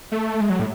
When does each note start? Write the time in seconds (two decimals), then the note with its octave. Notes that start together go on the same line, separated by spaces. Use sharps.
0.12 A3
0.41 G#3
0.50 F#3
0.59 A2